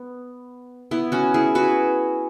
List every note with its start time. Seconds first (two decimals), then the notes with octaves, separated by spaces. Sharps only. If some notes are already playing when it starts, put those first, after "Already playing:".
Already playing: B3
0.91 B3 E4
1.12 C#4 F#4
1.34 E4 G#4
1.55 F#4 B4